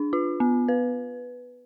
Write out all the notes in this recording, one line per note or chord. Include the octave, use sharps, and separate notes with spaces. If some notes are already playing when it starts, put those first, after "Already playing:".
Already playing: D4
F4
B3
B4